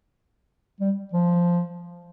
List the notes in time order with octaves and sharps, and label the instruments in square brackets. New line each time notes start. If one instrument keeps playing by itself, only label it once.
[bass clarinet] G3
F3